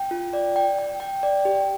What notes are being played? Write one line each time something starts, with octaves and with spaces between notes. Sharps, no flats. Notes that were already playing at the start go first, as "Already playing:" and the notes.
Already playing: G5
F4
D5
G5
G5
G5
D5
G4